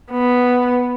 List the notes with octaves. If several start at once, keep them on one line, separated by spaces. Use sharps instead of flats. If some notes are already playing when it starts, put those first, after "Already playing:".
B3